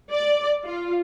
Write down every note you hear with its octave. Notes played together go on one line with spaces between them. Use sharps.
D5
F4